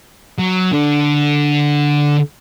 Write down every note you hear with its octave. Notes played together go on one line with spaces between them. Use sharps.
F#3
D3